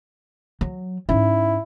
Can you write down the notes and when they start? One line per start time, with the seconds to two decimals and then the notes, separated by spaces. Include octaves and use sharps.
0.61 F#3
1.09 G#2 C#4 E4